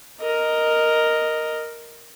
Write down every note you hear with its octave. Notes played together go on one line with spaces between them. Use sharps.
A#4 D#5